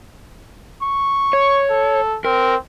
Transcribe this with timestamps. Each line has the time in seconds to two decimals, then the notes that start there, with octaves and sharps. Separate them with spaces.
0.83 C#6
1.33 C#5
1.70 A4
2.25 C4 A#4